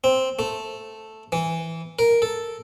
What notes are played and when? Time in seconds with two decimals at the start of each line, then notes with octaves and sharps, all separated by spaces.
0.04 C4
0.39 A3
1.32 E3
1.99 A#4
2.22 A4